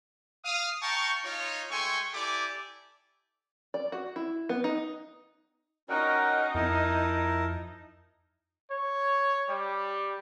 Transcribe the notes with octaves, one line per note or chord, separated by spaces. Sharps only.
F5 D#6
F5 G5 A5 A#5 C#6
D#4 F4 C#5
G#3 A3 G5 G#5 C6 C#6
E4 G4 A4 D5 G#5 D6
D5
F#4
E4
B3
D#4
C#4 D#4 F#4 A#4 D#5 F#5 G5
F2 E4 A#4 A5
C#5
G3